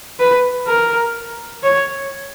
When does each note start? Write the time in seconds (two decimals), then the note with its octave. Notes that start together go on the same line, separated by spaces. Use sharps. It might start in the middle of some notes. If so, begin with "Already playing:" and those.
0.19 B4
0.67 A#4
1.63 C#5